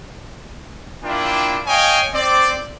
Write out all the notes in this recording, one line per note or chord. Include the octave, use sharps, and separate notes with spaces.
A#3 D4 E4 F4 G5
C#5 D#5 F5 G5 G#5
C4 D5